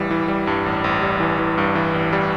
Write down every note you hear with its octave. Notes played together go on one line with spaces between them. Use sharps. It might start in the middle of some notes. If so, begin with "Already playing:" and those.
Already playing: A1 E3 G3
E3
G3
G2
A1
A1
G3
E3
E3
G2
E3
A1
G3